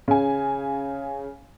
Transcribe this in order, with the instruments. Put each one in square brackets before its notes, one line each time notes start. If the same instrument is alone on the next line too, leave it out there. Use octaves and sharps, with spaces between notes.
[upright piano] C#3 G#5